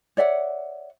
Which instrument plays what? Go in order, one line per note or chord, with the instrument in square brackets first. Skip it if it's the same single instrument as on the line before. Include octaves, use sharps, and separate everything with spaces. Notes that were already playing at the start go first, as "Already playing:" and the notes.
[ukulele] C#5 D5 E5 F#5